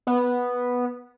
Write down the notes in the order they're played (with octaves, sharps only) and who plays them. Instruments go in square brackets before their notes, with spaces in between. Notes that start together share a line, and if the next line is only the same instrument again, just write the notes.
[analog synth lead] B3